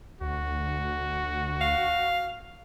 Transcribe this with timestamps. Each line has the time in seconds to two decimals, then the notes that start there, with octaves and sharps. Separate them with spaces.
0.21 D2 F#4
1.61 F5